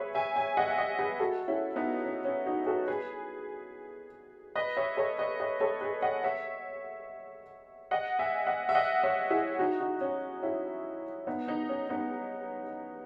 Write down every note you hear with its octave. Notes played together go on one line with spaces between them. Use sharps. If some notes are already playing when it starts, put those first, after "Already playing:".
Already playing: G#4 B4 C#5 E5
E5 G#5
E5 G#5
D#5 F#5
E5
D#5 F#5
G#4 B4
F#4 A4
C#4 E4
B3 D#4
C#4
C#4
D#4 F#4
F#4 A4
G#4 B4
B4 D#5
C#5 E5
A4 C#5
B4 D#5
B4 D#5
A4 C#5
G#4 B4
D#5 F#5
C#5 E5
D#5 F#5
E5 G#5
D#5 F#5
E5
D#5 F#5
C#5 E5
E4 G#4
D#4 F#4
D#4 F#4
C#4
C#4 E4
B3 D#4
B3 D#4
C#4
B3 D#4